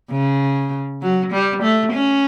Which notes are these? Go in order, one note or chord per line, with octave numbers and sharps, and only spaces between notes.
C#3
F#3
G3
A3
C#4